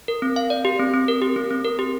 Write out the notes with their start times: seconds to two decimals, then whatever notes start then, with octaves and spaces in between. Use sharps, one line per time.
0.08 A#4
0.22 C4
0.36 F5
0.50 D5
0.65 G4
0.80 C4
0.94 C4
1.08 A#4
1.22 G4
1.36 C4
1.51 C4
1.65 A#4
1.79 G4